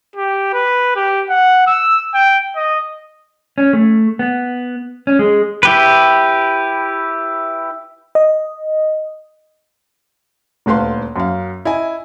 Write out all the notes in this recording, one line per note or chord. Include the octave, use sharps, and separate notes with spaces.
G4
B4
G4
F#5
E6
G5
D#5
C#4
A3
B3
C#4
G#3
E4 G4 B4
D#5
D#1 D2 B4 F5 C6
F#2 F5
E4 D#5 G#5